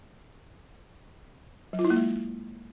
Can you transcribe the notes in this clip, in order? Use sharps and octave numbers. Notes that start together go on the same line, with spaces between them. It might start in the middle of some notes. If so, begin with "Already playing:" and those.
F#3
F4
E4
A#3
G#3